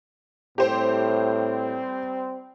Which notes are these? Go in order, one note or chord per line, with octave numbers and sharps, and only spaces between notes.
A2 G3 C4 G4 C5